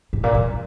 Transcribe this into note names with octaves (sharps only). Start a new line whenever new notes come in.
G#2
A#2
F#2